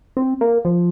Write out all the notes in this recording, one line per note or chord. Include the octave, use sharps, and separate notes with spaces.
C4
A#3
F3